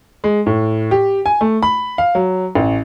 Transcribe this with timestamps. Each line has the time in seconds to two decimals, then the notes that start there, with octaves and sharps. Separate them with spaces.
0.24 G#3
0.46 A2
0.91 G4
1.26 G#5
1.41 A3
1.63 B5
1.98 F5
2.15 F#3
2.55 A1